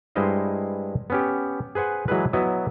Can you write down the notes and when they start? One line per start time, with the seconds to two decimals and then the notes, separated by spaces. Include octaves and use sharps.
0.16 G2 G#3 E4 C5 D#5 F5
1.10 B3 C#4 G4
1.75 G#4 B4 C5 F#5 G#5
2.08 E3 F#3 G#3 E4 G#4 B4
2.33 F#3 B3 E4 D#5 E5